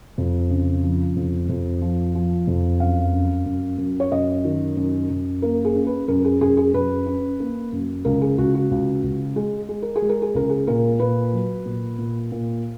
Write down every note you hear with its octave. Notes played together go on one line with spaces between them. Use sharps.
F2
C#3
F3
F2
F2
F3
F3
F2
F#2 F5
F#2
F#2
F#2
C#5
F#2 D#5
D#3
F#2
F#2
A#3 A#4
G#4
C#4
B4
F#2 A#4
G#4
F#2 G#4
G#4
F#2 B4
C#4
A#3
F#2
C#2 A#4
G#4
C#2 F#4
F#4
C#2
C#2
G#3 G#4
G#3 G#4
A#4
G#4
G#3
A#4
G#4
C#2 A#4
G#4
A#2 A#4
A#2 B4
F#3
A#2
A#2
A#2